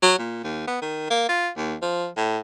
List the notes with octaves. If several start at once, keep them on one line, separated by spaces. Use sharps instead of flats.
F#3
A#2
D#2
B3
D#3
A#3
F4
D#2
F3
A2